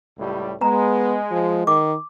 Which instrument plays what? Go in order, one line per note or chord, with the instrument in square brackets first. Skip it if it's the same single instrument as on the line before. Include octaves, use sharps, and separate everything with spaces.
[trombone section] C#2 A2 G3
[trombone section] G#3 [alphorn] B3 [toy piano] A#5
[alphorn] F3
[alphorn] D#3 [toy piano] D6